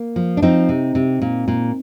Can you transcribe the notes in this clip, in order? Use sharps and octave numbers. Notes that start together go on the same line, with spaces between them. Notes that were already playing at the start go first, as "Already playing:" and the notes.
Already playing: A#3
F3
D4
F3 C4 D#4
C3
C3
A#2
A#2